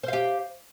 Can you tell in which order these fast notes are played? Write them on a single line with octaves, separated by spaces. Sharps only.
C5 F5 G4